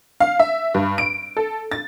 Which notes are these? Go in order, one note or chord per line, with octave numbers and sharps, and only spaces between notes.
F5
E5
G2
D7
A4
A6